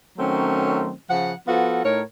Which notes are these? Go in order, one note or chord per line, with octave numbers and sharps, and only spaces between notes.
D#3 F#3 A3 C4 C#4
C#3 F3 F#5
F3 B3 F4 F#4 A4
A2 D#4 A#4 C#5